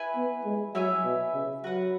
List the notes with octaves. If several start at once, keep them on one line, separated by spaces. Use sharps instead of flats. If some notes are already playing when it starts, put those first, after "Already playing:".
Already playing: E4 B4 G#5
B3
G#3
F#3 E4 C#5 E5 G#5
B2
C#3
F#3 F#4 B4 F#5